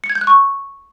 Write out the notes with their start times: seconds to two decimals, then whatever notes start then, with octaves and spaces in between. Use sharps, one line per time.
0.04 C#7
0.10 G#6
0.15 G6
0.21 F#6
0.27 C#6